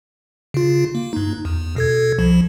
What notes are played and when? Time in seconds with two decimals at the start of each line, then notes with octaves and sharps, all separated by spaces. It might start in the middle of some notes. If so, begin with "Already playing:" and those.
0.54 C#3 F4
0.95 A#3
1.13 G2 D#4
1.45 E2
1.76 B2 A4 G#6
2.19 C2 F3